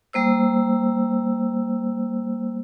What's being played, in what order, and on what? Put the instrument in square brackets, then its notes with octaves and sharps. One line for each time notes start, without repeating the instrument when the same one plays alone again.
[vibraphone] G3 A#3 C5 E6